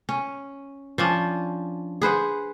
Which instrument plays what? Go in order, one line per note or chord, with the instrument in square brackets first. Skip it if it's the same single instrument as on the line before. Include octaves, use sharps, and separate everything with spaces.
[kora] C#4
F3 C#4 D4
G#4 B4 C5 F#5